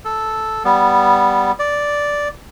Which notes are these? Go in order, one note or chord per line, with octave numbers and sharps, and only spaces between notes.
A4
G3 B3
D5